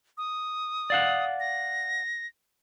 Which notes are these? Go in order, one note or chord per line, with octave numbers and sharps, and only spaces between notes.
D#6
D5 F5 F#5
A#6